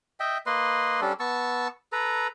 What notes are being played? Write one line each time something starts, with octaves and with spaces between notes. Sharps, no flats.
D#5 E5 G5
A#3 B4 D#5 C6
G3 C#4 D4 A4
B3 A5 C#6 E6
A4 B4 A#5